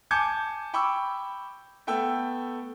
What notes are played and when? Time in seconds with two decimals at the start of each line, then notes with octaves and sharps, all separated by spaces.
0.11 G#5 A5 D6 G6 G#6 C#7
0.74 G5 B5 C#6 D6 E6
1.87 A3 B3 G5 E6